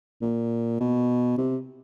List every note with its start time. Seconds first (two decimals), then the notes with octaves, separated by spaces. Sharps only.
0.22 A#2
0.80 B2
1.38 C3